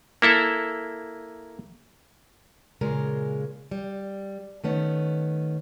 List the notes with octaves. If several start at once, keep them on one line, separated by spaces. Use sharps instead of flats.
A#3 E4 A4 E5
A#2 C#3 G#3 A#4
G3
D#3 A3 B3 C#4